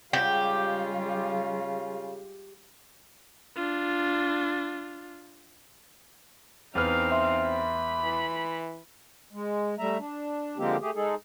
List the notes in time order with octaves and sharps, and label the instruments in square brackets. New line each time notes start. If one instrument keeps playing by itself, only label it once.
[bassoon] C#3 [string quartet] G3 G#3 F4 [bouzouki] G4
[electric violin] D4 F4
[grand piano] E2 B4 F6 [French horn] C4 [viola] D#4 F5
[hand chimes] E5 C6
[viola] B5
[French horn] E3
[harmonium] G#3
G3 A3 E5 A#5
D4
D3 F3 G#3 A#3 C4 G4
A3 G4 G#4
G#3 D#4 G#4 A4